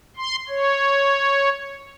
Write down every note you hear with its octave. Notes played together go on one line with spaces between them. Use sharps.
C6
C#5